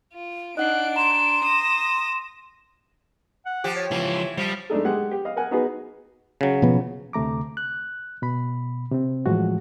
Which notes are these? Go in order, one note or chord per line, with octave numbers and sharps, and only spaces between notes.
F4
D4 D#4 D#5 F#5 F#6 C7 D7
A#5 C6 E7
D#6 A#6
F#5
F3 G4
C#5
C#2 E3 F3
F3 G3
G#3 A3 D4 D#4 A4
G#3 G4 F#5
G4
D#5 F5
A#4 F#5 G#5
B3 D#4 F#4 G#4 B4
C#3 F#3
B2 F3 B3
D2 C3 A3 A#5 D6
F#6
B2 B5
C3 C4
A2 E3 F3 G#3 F#4